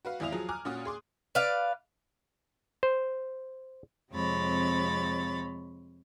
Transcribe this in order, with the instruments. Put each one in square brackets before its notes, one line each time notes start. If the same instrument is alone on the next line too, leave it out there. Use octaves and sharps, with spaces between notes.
[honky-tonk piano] F#4 B4 F5
G#1 E2 E4 F5 D#6 F7
F3 F#3 F4 G#4
G#5 A#5 D6 F6 F#6
A#2 C#4 F#4 D#6
G#4 C6 D6
[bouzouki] B4 D5 F5
[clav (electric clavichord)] C5
[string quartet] F2 C3 G#3 C#5 B5 A6